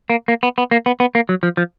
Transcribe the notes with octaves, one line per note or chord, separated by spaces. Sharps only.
A#3
A#3
B3
B3
A#3
B3
B3
A#3
F#3
F3
F3